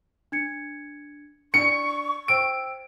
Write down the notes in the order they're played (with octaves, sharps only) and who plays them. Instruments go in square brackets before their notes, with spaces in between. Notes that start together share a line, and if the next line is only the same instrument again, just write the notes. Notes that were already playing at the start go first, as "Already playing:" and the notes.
[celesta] D4 G#6 C#7
[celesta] D4 D5 [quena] C#6 [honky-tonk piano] C#7
[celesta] C5 G5 E6 [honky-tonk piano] D7